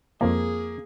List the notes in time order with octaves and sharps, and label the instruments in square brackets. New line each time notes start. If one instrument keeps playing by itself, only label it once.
[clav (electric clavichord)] F2 F3 G#3 [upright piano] A#3 [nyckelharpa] G#4